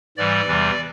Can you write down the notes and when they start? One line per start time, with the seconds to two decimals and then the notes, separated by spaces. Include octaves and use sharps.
0.17 G#2 E3 G3 D5
0.47 E2 C3 E3 G3